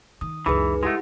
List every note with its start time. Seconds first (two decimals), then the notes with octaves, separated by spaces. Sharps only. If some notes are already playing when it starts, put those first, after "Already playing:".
0.21 D#3 D#6
0.46 C#2 F#2 E3 D#4 G#4 B4
0.83 G#3 A3 E4 G4 F#5